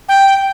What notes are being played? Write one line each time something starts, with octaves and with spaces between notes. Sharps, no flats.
G5